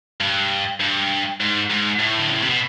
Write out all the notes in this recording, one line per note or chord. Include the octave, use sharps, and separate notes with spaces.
G2
G2
G#2
G#2
A2
D3
C#3
C3
B2